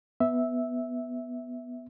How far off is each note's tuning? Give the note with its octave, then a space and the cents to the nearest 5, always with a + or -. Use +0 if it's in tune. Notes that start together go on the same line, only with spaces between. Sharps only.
B3 +0 E5 -10